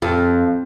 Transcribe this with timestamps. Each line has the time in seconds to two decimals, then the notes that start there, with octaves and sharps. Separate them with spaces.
0.02 F2